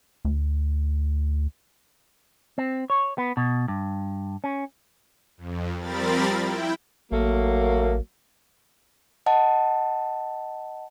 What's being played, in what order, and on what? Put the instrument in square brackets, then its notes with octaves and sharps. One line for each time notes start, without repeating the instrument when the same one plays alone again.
[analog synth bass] D2
[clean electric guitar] C4
C#5
B3
B2
G2
C#4
[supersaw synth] F2
F3 G3 C4 A#4 B5 A6
E4 G5
[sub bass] A1 [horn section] F#3 A3 A#3
[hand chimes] D#5 F#5 A5